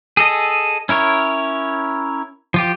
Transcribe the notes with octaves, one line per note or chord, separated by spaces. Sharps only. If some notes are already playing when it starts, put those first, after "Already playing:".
G#4 A4 D#5
C#4 E4 A#4 C#5
F3 F4 G4